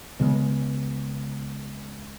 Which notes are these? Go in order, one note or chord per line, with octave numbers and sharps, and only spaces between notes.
C#2 C#3 G#3 B3